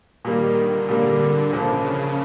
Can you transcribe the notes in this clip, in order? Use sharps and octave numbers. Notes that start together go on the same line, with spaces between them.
A#2 D#3 G3 A#3
D3
A#2 D3 G3 A#3
A#1 A#2 C#3 F3 A#3